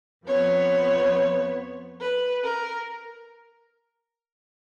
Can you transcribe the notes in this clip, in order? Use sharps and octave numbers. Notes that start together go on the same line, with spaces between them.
F2 F3 B3 C#5
B4
A#4